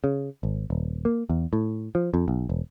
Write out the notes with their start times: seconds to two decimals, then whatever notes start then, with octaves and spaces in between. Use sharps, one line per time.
0.04 C#3
0.43 G#1
0.70 D#1
1.05 A#3
1.30 E2
1.53 A2
1.95 F3
2.14 F2
2.28 B1
2.49 E1